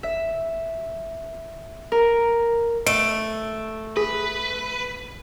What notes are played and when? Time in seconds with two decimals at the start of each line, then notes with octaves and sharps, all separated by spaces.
0.03 E5
1.92 A#4
2.87 A3 D#5 D7
3.97 G#4 B4